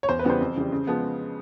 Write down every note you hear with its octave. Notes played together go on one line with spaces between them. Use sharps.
C#5
E2 C5
B4
C#3 E3 G3 B3 C5
F2
C#3 E3 G3
C#3
F3 G#3 B3